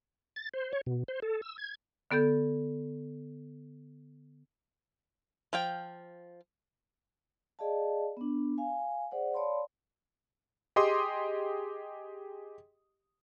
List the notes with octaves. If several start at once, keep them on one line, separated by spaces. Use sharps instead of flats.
A6
C5
C#5
B2
C5
A4
E6
G#6
D3 B3 A4 G6
F3 F5 G5
G#4 D5 D#5 F5 A5
B3 D4
F5 G#5
G#4 C5 D5 F#5
C#5 D5 F5 A5 B5 C6
G4 G#4 D#5 C6 D6 D#6